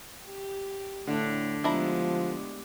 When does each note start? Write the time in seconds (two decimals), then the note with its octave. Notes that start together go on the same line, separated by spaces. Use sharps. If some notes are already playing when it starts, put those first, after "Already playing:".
0.25 G4
1.07 A2 D3 A3 D4
1.64 F3 G#3 B3 D4 E4 G4 A#5